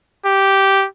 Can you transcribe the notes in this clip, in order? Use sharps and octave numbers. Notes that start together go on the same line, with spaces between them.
G4